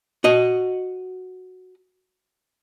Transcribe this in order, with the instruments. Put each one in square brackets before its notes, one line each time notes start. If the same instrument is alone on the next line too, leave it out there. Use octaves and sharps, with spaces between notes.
[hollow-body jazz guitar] F#4 D#5